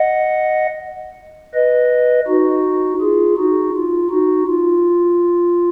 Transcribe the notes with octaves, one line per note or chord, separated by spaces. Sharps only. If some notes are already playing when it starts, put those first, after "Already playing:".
Already playing: D#5 F#5
B4 D#5
D#4 F#4
F4 G#4
D#4 F#4
F4
D#4 F#4
F4